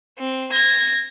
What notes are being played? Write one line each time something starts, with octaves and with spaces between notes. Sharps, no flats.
C4
G#6 A#6